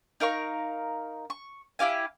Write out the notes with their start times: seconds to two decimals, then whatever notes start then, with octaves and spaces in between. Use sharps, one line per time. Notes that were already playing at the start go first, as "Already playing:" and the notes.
0.20 D#4 A#4 F5 C#6
1.30 C#6
1.79 E4 G4 F5 G#5